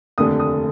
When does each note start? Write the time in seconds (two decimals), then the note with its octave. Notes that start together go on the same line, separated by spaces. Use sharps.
0.18 F1 D#2 D3 A3 D4 D#6
0.40 D#6